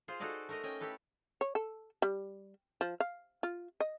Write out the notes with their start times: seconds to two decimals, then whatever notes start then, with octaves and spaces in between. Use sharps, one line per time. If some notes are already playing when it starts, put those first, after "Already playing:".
0.08 F4 G#4 C5
0.20 D#4 F#4 G#4 A4 D5 D#5
0.49 A3 A#4 D#5
0.63 C#4 D#5 G5
0.81 E4 G4 A4 B4
1.41 C#5
1.55 A4
2.02 G3
2.81 F3
3.00 F5
3.43 F4
3.80 D#5